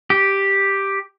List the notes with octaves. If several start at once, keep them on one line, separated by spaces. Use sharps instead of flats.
G4